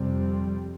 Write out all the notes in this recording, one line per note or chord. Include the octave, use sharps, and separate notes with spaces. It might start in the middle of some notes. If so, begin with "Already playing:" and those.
Already playing: F2 C3 G3 C4